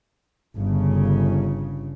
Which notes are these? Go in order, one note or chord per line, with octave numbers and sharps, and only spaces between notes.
G1 C#3